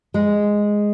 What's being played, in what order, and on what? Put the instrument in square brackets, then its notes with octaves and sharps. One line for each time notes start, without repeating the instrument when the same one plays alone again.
[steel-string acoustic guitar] G#3